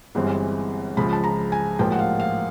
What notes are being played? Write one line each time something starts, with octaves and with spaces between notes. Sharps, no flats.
G1 G2 E3 G#3 C4
C#2 C#3 F3 B5
A5
A#5
G#5
A1 G#2 F3 A#3 G5
F#5
F5
F5